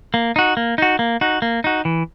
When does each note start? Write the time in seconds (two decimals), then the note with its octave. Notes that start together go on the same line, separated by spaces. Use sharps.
0.14 A#3
0.36 D#4 F#4
0.57 A#3
0.78 D#4 F#4
0.99 A#3
1.21 D#4 F#4
1.42 A#3
1.64 D#4 F#4
1.85 E3